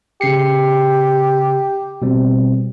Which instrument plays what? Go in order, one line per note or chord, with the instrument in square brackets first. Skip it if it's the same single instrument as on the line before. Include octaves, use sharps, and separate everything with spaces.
[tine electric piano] C#3 C7 C#7 [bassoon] G4
[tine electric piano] B2 G3 C4